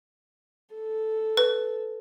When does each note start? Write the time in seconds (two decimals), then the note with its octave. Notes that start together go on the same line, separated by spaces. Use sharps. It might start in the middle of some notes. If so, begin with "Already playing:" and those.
0.75 A4
1.37 B4